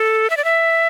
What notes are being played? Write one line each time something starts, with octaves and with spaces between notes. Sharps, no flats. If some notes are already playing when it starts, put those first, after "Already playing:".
Already playing: A4
E5
D5
E5